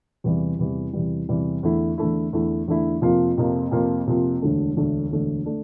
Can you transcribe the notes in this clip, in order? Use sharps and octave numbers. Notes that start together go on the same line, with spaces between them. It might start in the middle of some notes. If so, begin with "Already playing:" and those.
E2 C3 E3 G3
E2 C3 E3 G3
E2 C3 E3 G3
E2 C3 E3 G3
E2 D3 A3 E4
E2 D3 A3 E4
E2 D3 A3 E4
E2 D3 A3 E4
F2 C3 F3 A#3 F4
F2 C3 F3 A#3 F4
F2 C3 F3 A#3 F4
F2 C3 F3 A#3 F4
E1 D2 D3 A3 D4
E1 D2 D3 A3 D4
E1 D2 D3 A3 D4
D3 A3 D4